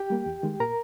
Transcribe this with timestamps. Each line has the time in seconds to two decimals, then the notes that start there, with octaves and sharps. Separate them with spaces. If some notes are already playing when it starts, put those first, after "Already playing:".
Already playing: G4 G5
0.10 G3 A#3
0.26 E2
0.43 D#3 G#3
0.60 A#2 A#4 A#5